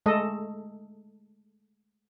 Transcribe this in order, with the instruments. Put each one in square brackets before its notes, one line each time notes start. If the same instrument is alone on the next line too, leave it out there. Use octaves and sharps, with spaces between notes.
[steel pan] G#3 A3 A4 D#5